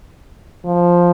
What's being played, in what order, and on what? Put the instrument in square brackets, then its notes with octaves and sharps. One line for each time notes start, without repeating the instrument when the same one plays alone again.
[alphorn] F3